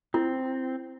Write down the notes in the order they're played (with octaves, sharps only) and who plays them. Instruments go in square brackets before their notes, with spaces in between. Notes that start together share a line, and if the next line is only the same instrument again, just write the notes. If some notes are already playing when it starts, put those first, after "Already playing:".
[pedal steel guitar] C4 [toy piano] E4